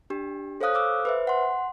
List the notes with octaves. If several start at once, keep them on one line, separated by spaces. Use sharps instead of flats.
D4 G4
A4 C5 C#5 F5 D#6 F#6
A4 C5 F5 D6 E6 F#6
B4 C5 E5
F#5 C6